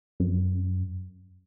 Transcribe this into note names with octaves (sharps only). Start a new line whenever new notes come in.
F#2